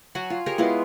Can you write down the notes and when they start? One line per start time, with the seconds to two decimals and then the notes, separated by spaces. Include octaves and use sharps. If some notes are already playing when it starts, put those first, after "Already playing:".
0.15 F#3 F#4 F#5 G#5
0.30 F4
0.46 G4 G#4 A#4 C#5
0.58 G#3 B3 E4 F4